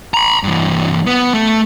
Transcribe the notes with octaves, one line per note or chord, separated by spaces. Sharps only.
A#5 B5
G2 E3
B3
A3